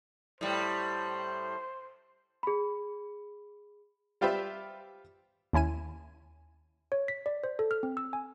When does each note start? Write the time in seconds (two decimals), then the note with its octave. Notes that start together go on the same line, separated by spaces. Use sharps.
0.41 A2 G3 C5
2.43 G#4 B5
4.21 G3 F4 G4 B4 C5 E5
5.53 D#2 C#4 E4 G#5 D#7
6.92 C#5
7.08 B6
7.26 D5
7.44 C5
7.59 A4
7.71 F6
7.83 C4
7.97 E6
8.13 G#5